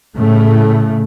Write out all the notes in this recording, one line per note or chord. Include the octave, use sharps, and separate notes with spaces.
A2 C#3 A3